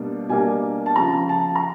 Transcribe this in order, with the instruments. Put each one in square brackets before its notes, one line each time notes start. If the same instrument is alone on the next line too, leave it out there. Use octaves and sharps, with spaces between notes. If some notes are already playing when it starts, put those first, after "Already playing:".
Already playing: [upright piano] B2 G3 A#3 D4
B2 G3 A#3 D4 G#5
A5
C#2 C#3 F3 A#5
A5
A#5